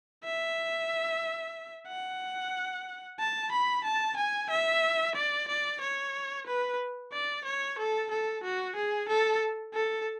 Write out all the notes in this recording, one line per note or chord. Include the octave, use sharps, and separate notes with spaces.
E5
F#5
A5
B5
A5
G#5
E5
D5
D5
C#5
B4
D5
C#5
A4
A4
F#4
G#4
A4
A4